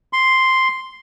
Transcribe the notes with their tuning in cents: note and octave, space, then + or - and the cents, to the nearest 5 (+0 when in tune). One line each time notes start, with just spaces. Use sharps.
C6 +0